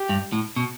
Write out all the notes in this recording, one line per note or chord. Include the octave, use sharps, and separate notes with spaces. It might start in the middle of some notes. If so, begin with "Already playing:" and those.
Already playing: G4
G2
A2
B2